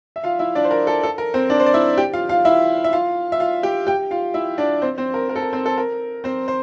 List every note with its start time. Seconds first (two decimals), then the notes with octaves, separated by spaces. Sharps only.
0.16 E5
0.24 F4 F5
0.39 E4 E5
0.55 D4 D5
0.64 C5
0.71 A#4
0.87 A4
1.03 A4
1.18 A#4
1.34 C4 C5
1.50 D4 D5
1.60 C5
1.66 D5
1.74 E4 E5
1.98 G4 G5
2.13 F4 F5
2.29 F4 F5
2.45 E4 E5
2.84 E5
2.93 F4 F5
3.32 E5
3.40 F4 F5
3.63 G4 G5
3.87 G4 G5
4.11 F4 F5
4.34 E4 E5
4.58 D4 D5
4.82 C4 C5
4.98 C4 C5
5.14 A#4
5.29 A#4
5.36 A4
5.42 A#4
5.53 C4 C5
5.66 A4
5.78 A#4
6.24 C4 C5
6.48 C5